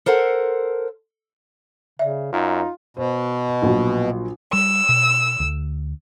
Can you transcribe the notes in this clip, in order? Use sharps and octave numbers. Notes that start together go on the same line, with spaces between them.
A4 A#4 C5 F#5
C#3 D5 E5
F#2 D#4 F4
B2 C5
A#1 F#3
G3 E6
B2
D2 D3